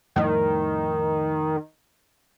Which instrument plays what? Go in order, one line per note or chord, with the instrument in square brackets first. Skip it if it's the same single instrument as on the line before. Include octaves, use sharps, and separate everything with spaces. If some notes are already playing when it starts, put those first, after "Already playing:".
[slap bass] F2 A2 G3 [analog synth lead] D#3